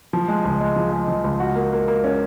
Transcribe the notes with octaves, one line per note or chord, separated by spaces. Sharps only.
F3
G#3
C#2
G#3
F3
G#3
F3
C#2
F#4
A#3
A#3
A#3
C#4